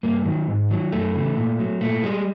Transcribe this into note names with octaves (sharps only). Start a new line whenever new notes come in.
G2 A#3
D#3 F#3
G#2
D#3 F#3
F#2 A3
C#3 E3
A#2
F#3
A#2 A3
G3 G#3